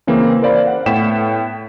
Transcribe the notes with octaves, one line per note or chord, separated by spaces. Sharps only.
C#3 E3 A#3 C4
A#4 C5 D5 F5 B5
F#5
A2 B3 G5 B6 E7